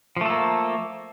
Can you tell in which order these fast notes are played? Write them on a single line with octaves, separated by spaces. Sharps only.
F3 A3 A4 A#3